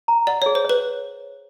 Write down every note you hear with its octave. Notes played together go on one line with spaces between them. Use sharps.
A#5
D5 F#5
G#4 C#5
C5
B4 C#5